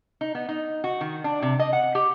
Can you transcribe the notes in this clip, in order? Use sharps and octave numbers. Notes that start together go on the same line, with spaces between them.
D#4
B3
D#4
F#4
D#3
D4
C3
D#5
F#5
G4